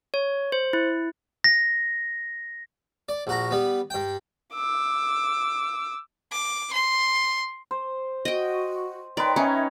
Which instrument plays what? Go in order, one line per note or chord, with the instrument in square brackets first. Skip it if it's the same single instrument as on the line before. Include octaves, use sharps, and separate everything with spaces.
[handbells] C#5
C5
E4
[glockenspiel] A#6
[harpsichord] D5
A#1 F#4 A#5
G3 B3
G2 G5
[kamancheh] D6 E6
[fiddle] D6
C6
[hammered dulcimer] C5
[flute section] F#4 [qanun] D#5 G5
[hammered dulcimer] D#3 B4 [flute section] C#5 G5 C6 [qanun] D5
[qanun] C#4 [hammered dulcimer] D#4 C#5 [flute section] E5 G#5